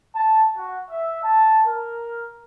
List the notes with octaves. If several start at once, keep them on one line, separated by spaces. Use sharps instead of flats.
A5
F#4
E5
A5
A#4